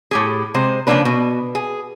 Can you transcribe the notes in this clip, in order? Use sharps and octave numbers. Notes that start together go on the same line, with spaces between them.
A2 G4 G#4
C3 G#3 C5
C#3 F3 A3 A#3 D4 B4
B2
G#4